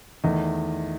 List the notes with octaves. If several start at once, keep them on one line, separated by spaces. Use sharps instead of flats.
E2 D#3 A3 D#5